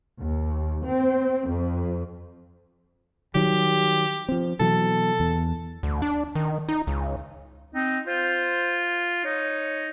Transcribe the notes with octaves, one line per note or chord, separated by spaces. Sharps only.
D#2
C4
F2
D#3 F#3 G3 G4
F3 C4
B2 E3 F#3 A4
E2
D2
D4
D#3
D#4
C#2
C4 D#4
F4 C5
D#4 C#5